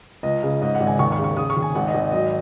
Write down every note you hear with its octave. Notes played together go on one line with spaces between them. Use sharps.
C#2 D#5
C#3 D#5
G#2 D#5
F#5
G#1
G#5
D#2 C#6
C#6
C#3
C#6
C#3 D#6
C#6
D#2
G#5
G#1 F#5
D#5
G#1
D#5
F#3 D#5